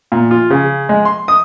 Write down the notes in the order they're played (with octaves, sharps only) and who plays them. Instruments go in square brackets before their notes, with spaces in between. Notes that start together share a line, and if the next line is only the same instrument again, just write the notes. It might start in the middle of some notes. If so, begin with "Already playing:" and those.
[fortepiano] A#2
F4
C#3
G#3
C6
D#6